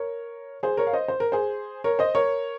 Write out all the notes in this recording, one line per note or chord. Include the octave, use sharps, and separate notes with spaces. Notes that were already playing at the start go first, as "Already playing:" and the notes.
Already playing: A#4 C#5
G#4 C5
A#4 C#5
F5
C5 D#5
C5
A#4
G#4 C5
A#4 C#5
C5 D#5
A#4 C#5